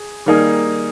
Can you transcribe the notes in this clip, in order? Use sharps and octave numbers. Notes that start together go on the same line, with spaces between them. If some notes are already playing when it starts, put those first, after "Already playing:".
Already playing: G#4
D#3 G3 A#3 D#4 G#4